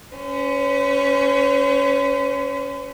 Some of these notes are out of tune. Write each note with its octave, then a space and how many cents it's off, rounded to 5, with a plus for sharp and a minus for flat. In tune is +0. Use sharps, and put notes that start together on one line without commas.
C#4 +15 C5 -45